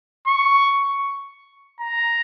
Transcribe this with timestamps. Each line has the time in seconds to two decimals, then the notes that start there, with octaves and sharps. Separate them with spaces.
0.27 C#6
1.81 A#5